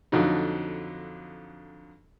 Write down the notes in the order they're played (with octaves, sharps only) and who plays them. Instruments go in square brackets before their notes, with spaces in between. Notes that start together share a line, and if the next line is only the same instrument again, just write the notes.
[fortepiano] F2 D3 F#3 D#4